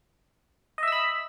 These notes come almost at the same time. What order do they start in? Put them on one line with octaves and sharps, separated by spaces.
D#5 E5 E6 B5